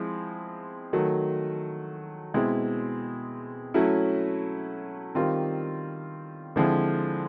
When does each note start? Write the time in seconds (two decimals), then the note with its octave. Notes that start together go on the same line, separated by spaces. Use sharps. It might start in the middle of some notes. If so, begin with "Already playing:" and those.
Already playing: F3 G#3 C4 E4
0.93 D#3 F#3 A3
2.34 B2 G#3 C4 E4
3.74 F#3 A3 C#4 E4
5.15 D#3 G3 C4 F4
6.56 D3 F3 G#3 C4 E4